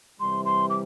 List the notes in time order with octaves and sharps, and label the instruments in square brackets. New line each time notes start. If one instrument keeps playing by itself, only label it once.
[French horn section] C3 E3 G3 [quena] C6
[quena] C6
D6